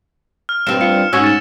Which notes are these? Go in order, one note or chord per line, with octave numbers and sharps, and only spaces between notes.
F6
G2 C4 E7
F4 C#7
G#2 C#4 F#4 E6 F6
A6 E7